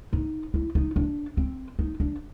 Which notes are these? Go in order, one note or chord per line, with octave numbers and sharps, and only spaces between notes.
D#4
E4
D#4
D4
C4
D#4
D4